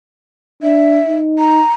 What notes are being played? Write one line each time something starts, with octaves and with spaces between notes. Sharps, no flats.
D4 E5
D#4
A#5